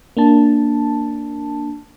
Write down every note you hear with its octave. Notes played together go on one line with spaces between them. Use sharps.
A#3 D4 A5